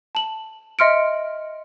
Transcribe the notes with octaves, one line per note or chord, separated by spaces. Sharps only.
A5 F#7
D#5 E5 C6 F6 C#7 D7